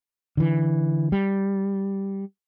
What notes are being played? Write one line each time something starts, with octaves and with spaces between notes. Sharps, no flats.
D3 E3
G3